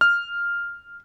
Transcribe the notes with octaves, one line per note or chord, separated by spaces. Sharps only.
F6